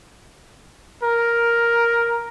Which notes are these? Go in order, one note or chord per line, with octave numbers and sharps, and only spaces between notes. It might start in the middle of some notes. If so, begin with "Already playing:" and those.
A#4